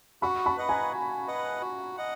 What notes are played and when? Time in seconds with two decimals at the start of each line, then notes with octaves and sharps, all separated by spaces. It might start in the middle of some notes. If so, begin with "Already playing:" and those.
0.22 F#4 B5 C#6
0.46 A5 B5
0.57 B4 D#5 F#5
0.69 G#5 A#5
0.93 F#4
1.27 B4 D#5 F#5
1.61 F#4
1.97 D#5 F#5